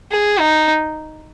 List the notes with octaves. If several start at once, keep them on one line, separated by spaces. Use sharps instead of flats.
G#4
D#4